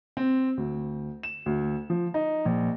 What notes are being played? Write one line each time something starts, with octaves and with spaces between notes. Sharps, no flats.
C4
D2
E7
D2
F3
D#4
A#1